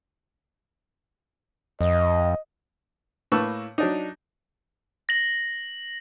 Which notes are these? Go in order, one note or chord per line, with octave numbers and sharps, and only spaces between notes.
F2 D#5
A2 A#3 B4 A5 C#6 E6
F#3 D4 D#4
A#6 F#7